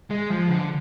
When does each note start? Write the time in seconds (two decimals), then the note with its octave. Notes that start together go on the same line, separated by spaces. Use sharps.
0.10 G#3
0.30 F3
0.49 D3